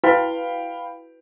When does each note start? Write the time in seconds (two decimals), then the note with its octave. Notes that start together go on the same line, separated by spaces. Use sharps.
0.04 E4 F#4 B4 F5 G5 B5